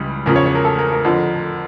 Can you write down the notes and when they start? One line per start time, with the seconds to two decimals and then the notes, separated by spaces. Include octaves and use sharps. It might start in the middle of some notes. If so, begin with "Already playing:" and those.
Already playing: C#2 C#3 E3 G3
0.26 E2 C#3 F3 A#4
0.36 C#5
0.46 C#5
0.55 A#4
0.65 A4
0.79 A#4
0.92 A#4
1.05 F2 D3 F3